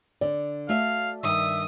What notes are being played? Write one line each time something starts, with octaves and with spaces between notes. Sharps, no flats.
D3 D5
A3 F#4 E5 F5
G2 D#3 E5 D#6